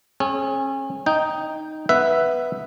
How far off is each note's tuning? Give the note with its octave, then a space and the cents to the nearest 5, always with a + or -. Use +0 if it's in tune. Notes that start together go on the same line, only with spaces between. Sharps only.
C#4 -35 G#4 +40
D#4 +0 G5 +0
B3 +0 B4 +0 E5 +0